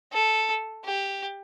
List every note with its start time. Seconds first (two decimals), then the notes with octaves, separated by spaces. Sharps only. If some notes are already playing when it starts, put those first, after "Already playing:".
0.12 A4
0.85 G4